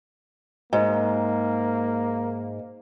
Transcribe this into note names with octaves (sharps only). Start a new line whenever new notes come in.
G#2 A#3